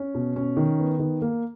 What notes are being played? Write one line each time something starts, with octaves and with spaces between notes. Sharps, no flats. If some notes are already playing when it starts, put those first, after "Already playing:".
Already playing: C#4
B2
C#4
D#3
B3
D#3
A#3